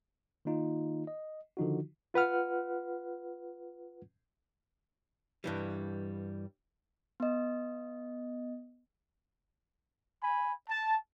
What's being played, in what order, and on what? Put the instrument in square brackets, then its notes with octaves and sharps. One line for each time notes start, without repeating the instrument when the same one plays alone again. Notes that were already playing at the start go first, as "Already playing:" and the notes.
[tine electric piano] D#3 A#3 D#4 F4
D#5
D3 D#3 F3 D#4 F4 F#4
[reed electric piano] F4 B4 F#5 F6
[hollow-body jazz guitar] G2 E3 G3
[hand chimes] B3 D#5
[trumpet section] G#5 B5
A5